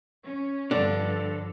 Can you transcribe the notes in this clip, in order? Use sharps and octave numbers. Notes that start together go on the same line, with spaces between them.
C#4
G2 D3 F3 D4 A4